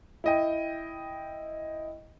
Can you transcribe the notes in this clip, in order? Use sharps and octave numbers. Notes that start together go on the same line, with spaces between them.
E4 D#5 G5